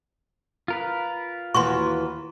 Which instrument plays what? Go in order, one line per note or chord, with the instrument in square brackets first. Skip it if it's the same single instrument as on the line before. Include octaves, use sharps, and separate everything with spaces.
[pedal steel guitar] F4 A#4 B4
[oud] D#2 E3 F#4 [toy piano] C6 C#6